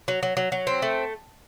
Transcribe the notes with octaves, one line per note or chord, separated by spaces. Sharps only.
F#3
F#3
F#3
F#3
C4
A3